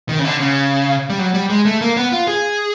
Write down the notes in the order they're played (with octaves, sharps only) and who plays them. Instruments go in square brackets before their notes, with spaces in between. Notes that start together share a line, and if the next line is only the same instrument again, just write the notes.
[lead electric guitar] D#3
C#3
D3
C#3
G3
F#3
G3
G#3
A3
A#3
B3
F4
G#4